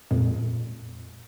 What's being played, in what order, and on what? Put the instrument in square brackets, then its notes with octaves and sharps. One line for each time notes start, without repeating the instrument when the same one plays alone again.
[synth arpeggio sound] F2 A#2 G#3